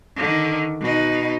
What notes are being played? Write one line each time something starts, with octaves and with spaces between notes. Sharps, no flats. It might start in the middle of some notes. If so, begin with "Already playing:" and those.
D3 D#3
B2 D#4